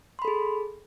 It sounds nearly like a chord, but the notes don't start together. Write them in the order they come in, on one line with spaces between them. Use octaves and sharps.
C6 B5 A4 G#4